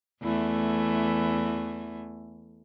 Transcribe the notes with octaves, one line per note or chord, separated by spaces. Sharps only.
E2 E3 A3